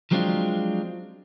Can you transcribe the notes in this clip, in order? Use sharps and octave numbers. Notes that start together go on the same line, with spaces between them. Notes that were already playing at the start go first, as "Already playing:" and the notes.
F3 F#3 G#3 C4 D4 F4